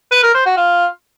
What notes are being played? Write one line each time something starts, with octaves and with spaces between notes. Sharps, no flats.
B4
A#4
C5
F#4
F4